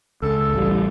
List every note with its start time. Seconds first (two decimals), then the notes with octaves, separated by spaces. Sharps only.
0.22 C#2 A4
0.54 A1 G3